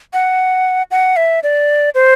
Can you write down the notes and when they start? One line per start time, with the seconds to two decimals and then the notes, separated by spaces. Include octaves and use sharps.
0.13 F#5
0.91 F#5
1.17 E5
1.43 D5
1.95 C5